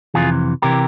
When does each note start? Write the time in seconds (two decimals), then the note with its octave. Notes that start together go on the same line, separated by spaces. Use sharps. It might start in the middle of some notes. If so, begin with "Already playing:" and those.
0.14 F2 C3 E3 F4 G#4
0.62 C3 E3 G4 A#4